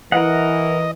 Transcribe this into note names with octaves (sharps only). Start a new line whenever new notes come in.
E3 A#4 D#5 F#5